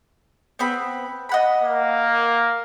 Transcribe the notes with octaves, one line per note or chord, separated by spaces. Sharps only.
B3 C4 B5
D#5 F#5 B5
A#3